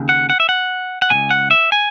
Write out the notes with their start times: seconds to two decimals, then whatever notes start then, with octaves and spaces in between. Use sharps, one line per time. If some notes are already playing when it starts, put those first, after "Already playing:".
Already playing: D#2 C#3
0.09 F#5
0.30 F#5
0.40 E5
0.49 F#5
1.02 F#5
1.10 B2 G#5
1.14 C#2
1.31 F#5
1.51 E5
1.72 G#5